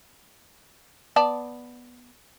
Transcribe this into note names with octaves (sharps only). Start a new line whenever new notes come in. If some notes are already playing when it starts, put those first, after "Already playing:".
B3 D5 A5